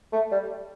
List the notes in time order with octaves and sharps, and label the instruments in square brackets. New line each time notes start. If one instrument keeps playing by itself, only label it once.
[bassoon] A3
G3